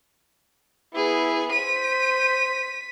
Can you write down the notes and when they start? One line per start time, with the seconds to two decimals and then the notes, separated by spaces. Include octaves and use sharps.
0.94 B3 E4 G#4
1.52 C5 B6 D#7